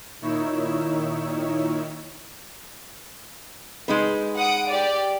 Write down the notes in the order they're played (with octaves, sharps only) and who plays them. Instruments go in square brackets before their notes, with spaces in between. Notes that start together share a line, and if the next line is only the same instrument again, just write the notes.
[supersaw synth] A#2 D#3 D#4 E4 C#5 E6
[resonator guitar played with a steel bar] G#3 D#4 B4
[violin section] F#5 D#6 D7
G4 D5